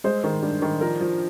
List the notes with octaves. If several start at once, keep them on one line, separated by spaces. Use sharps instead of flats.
G#3 C5
D#3
G2
D#3
F3 A#4
F3